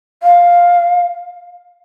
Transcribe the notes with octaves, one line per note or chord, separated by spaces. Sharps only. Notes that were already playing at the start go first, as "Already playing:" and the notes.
F5